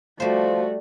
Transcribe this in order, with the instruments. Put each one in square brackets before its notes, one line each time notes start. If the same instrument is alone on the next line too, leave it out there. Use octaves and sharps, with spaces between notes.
[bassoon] F3 [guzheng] G3 C5 [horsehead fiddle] A3 F#4